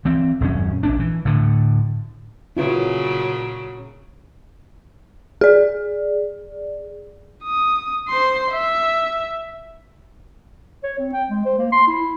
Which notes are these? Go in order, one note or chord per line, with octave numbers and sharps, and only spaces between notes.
E3 C4
D#1 F#2 C#4
A#1 C#4 D4
E3
A2 D3
A#2 C#3 F#3 E4 F4 B4
G#4 D5
D#6
C5 C6
E5
C#5
C4
G5
G#3
C5
A#3
C6
E4